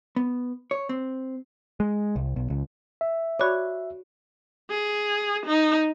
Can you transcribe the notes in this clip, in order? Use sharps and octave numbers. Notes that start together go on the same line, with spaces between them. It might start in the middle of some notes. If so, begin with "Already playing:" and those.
B3
C#5
C4
G#3
C2
B1
C#2
E5
F#4 C#5 D5 B5 D6
G#4
D#4